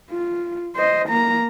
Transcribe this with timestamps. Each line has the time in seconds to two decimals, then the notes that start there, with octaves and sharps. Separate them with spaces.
0.11 F4
0.75 C5 D#5
1.08 A#3 A#5